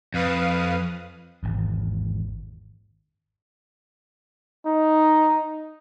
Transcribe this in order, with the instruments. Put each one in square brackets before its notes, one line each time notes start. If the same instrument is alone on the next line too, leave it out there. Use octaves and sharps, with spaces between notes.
[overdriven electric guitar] F2 [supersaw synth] B4 F5 D#6
[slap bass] G#1 E2
[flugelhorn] D#4